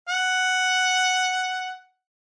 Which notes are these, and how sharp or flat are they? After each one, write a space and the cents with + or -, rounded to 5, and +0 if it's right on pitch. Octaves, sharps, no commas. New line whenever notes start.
F#5 +0